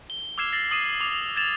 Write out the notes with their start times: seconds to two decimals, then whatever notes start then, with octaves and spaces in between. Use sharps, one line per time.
0.10 G7
0.38 D6 E6 F6 G#6 C7 E7
0.53 A6 A#6 C7 F#7
0.71 D#6 C7 D#7 E7
1.01 D6 F7
1.36 G#6 A6 E7 F7